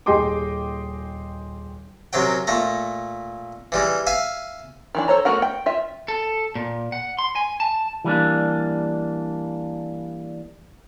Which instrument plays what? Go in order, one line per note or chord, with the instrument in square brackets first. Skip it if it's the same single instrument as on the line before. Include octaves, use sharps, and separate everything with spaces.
[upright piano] D#1 G#4 D#5 G5 C6 D6
[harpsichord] F#2 C3 F#3 G5
A#2 A3 A#5
E3 G3 G#3
E5 F5 G#5
[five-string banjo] D#3 E3 D4
A4 C5 C#5 A#5
A3 B3 F#4 A#4 F#5
G5
F4 E5
[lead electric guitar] A4
A#2
F#5
C6
G#5
A5
[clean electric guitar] E3 G3 A#3 D4